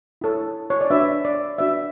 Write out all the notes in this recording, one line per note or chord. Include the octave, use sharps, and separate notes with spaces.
E4 A4 C#5
C#5
D5
D4 F#4 B4 E5
D5
D4 F#4 B4 E5